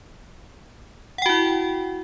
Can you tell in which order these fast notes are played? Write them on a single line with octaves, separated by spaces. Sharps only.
F#5 G5 F#4 E4